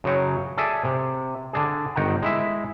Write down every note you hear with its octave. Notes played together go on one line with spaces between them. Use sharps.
F#2 C#3 F#3 C#5 G5
G#4 A4 D5 E5 G#5
C3
D3 D4 G#4
G1 D#3 F#5 G5 A#5
G#3 E4 E5